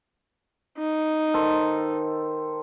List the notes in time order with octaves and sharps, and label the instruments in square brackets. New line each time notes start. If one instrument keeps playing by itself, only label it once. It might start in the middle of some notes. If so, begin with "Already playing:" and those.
[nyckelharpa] D#4
[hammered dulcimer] D#3 A4 C5